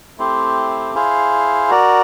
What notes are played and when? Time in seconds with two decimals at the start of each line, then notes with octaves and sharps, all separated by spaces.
0.18 A3 C4 E4 G4 C5
0.94 E4 G#4 C5 F5
1.70 F#4 A#4 D5